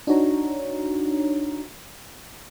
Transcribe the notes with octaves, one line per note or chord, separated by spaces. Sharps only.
D4 D#4 F#4 C#5 A#5